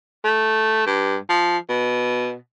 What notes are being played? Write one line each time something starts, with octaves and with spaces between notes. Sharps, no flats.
A3
G2
F3
B2